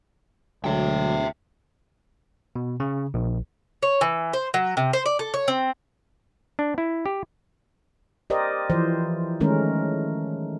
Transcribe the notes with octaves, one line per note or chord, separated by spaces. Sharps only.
D2 D3 F#3 G#3 E5 G5
B2
C#3
A#1
C#5
E3
C5
F#3
C3
C5
D5
A4
C#5
C4
D4
E4
G4
G4 A#4 C5 D5 D#5
E3 F3 C5
D#3 G#3 A3 C#4 A#4